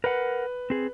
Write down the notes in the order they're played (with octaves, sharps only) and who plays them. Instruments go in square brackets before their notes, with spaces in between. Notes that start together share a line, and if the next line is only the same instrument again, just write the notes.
[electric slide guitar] A#4 F#5 [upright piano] B4
[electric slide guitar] C4 G#4